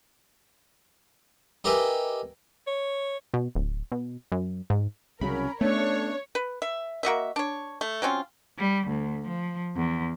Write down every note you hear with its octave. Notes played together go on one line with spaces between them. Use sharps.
D#4 G4 A#4 B4 E5 G#5
C#5
B2
D1
B2
F#2
G#2
C2 C#3 F#3 C#4 A#4 B5
A3 B3 C#4 D4 C#5
B4
E5
A#3 F#4 D#5 E5
D4 C#5
A3
F#3 C4 C#4 F4
G3
D2
F3
E2